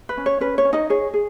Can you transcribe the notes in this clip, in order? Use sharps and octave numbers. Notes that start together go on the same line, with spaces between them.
B4
C#4
C#5
C#4 B4
C#5
C#4
D#4 D#5
G#4 C#5
G#4